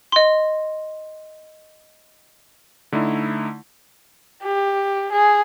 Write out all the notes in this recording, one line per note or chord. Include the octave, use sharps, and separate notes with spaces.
D#5 C6
D3 A3 D#4 E4
G4
G#4